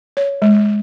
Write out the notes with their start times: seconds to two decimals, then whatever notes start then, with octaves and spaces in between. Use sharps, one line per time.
0.17 C#5
0.42 G#3